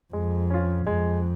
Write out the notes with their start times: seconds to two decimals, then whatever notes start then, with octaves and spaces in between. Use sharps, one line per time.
0.13 F2 G#3
0.50 C#4 F4
0.86 F2 G#3